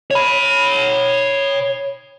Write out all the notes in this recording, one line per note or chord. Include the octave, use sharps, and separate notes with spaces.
C#5 B5